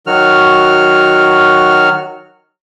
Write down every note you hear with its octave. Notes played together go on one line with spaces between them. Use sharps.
D#3 F#3 F#4 F6